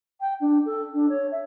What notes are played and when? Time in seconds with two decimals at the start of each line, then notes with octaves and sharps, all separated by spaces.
0.20 G5
0.40 D4
0.65 A4
0.93 D4
1.09 C#5
1.31 E5